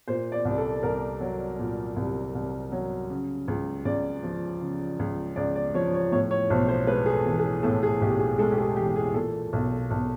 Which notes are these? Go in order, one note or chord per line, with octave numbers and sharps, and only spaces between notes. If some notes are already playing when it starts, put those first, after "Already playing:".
A#2 C5
D5
C2
A4
C2 A#4
F#3
A#2
C2
C2
F#3
C#3
C#2
C#2 D5
F3
C#3
C#2
C#2 D5
D5
F3 C#5
C#5
A2 C#5
C#5
B1 C5
C5
G#3 B4
G#4
A4
E3
G#4
A2 A4
G#4
B1 G4
G#4
G#3 A4
G4
G#4
E3 G4
G#4
A#2 A4
B1
B1